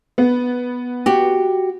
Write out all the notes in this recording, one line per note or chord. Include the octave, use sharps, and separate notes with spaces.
B3
F#4 G4